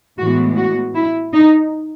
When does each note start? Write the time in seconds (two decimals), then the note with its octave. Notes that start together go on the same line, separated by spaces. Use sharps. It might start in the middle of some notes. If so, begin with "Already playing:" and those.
0.18 A2 E3 G#3 B3 F#4
0.56 F#4
0.95 E4
1.33 D#4